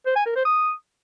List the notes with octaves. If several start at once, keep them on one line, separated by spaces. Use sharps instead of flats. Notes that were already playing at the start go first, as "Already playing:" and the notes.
C5
G#5
A#4
C5
D#6